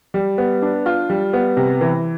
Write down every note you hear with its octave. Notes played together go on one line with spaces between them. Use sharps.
G3
B3
D4
F4
G3
B3
C3
E3